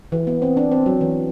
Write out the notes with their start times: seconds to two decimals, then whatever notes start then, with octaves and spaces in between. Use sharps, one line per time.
0.12 E3
0.27 B3
0.42 C4
0.57 D4
0.72 C4
0.86 F#3
1.01 E3